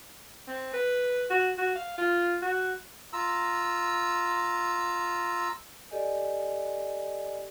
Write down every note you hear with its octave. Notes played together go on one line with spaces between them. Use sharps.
C4
B4
F#4
F#4
F5
F4
F#4
F4 A#5 E6
G4 A4 D5 D#5 G#5